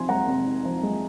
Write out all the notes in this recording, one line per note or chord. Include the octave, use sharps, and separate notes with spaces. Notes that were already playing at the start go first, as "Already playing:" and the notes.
Already playing: C3 F3 D#4 G#5 C6
G#3 F#5 A#5
C3
D#4
F3
G#3